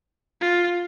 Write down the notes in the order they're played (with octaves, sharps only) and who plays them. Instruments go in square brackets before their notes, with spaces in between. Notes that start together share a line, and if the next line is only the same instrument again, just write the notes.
[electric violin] F4